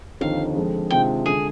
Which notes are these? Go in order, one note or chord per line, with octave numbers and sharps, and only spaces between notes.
D#2 D3 F3 C4 D#4 F5
F2 D3 G#3
C3 D#3 G#3 D4 F4 G5
D3 G#3 G#4